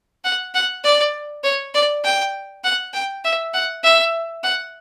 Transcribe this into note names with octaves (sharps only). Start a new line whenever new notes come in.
F#5
F#5
D5
C#5
D5
G5
F#5
G5
E5
F#5
E5
F#5